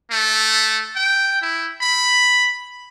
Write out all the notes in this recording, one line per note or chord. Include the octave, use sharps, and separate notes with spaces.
A3
G5
E4
B5